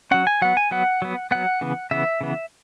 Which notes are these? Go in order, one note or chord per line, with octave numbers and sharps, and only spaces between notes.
F#3 C#4 F#5
G#5
F#3 B3 F#5
G#5
F#3 B3 F#5
F#3 B3
F#3 B3 F#5
C#3 E3 B3
C#3 E3 B3 E5
C#3 E3 B3